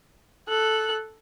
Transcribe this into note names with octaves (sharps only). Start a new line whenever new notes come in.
A4 F#6